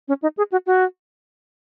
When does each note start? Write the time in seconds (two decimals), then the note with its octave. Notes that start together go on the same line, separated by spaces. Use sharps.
0.08 C#4
0.22 D#4
0.37 G#4
0.52 F#4
0.66 F#4